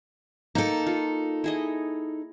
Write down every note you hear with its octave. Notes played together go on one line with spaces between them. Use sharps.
A#3 D#4 A4 G5
F4
E4 G#4 D#5